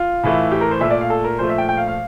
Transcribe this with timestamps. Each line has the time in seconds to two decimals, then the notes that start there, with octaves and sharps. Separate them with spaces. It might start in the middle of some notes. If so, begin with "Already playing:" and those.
Already playing: F4
0.23 A2 E3 A3
0.51 G4
0.61 A#4
0.71 C5
0.81 A#2 A3 E5
0.90 D5
1.01 F5
1.10 A4
1.24 A#4
1.39 A#2 F3 A3 C5
1.49 E5
1.58 G5
1.69 G5
1.77 F5
1.88 F5